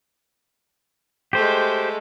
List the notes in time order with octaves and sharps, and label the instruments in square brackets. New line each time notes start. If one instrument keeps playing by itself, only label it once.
[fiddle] G#3 A3 [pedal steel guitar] G4 C5